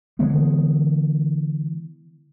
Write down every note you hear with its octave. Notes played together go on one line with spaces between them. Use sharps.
D3 E3 G#3 B3